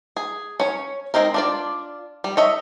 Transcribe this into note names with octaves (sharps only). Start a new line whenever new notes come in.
G#4
C#4 C#5
G#3 A#3 C4 D#4 A#4
D4 F4 D5
G3
C#5 D#5 E5